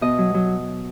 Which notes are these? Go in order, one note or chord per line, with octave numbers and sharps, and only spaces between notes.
B2 D#5
F#3
F#3